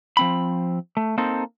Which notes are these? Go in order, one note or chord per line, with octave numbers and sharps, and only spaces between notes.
F3 C4 B5
A3
A#3 C4 D#4 A4